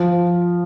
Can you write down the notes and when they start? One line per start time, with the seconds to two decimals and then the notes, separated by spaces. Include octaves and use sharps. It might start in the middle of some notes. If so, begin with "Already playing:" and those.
Already playing: F3